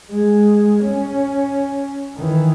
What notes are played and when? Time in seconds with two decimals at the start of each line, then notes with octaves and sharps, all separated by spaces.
0.10 G#3
0.84 C#4
2.16 D#3 E3